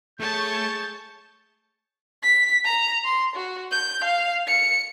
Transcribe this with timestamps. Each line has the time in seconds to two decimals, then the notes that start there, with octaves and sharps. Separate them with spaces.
0.20 A3 G#4 C#5 A5 C#6 G6
2.23 B6
2.64 A#5
3.04 C6
3.35 F#4
3.71 G6
4.04 F5
4.47 C#7